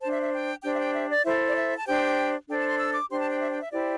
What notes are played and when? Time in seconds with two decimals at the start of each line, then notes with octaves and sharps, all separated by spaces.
0.01 D4 C5 A5
0.11 E5
0.22 E5
0.32 G5
0.62 D4 G4 C5 G5
0.74 E5
0.78 G5
0.94 E5
1.10 D5
1.24 E4 A4 C5 E5
1.47 D5
1.55 E5
1.77 A5
1.86 D4 G4 C5 G5
2.48 D4 A4 C5 G5
2.59 A5
2.68 C6
2.78 E6
2.93 D6
3.09 D4 G4 C5 C6
3.19 A5
3.30 G5
3.40 E5
3.50 G5
3.60 E5
3.71 E4 G4 C5 D5